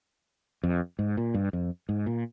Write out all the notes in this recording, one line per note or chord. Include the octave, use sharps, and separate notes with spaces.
F2
G#2
A#2
G2
F2
G#2
A#2